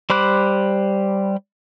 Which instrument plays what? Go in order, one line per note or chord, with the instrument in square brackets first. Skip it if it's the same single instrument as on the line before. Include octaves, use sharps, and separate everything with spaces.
[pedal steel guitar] G3 C5 B5 D6 F#6